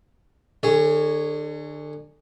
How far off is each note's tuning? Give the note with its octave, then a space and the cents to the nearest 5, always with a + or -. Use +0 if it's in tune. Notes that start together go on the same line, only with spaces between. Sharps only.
D3 +35 G#4 -15 C#5 +0